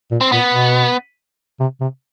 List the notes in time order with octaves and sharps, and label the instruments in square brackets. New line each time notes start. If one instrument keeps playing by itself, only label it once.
[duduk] A#2
[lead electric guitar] C4
[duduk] A#2 [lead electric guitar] B3
[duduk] B2
C3
C3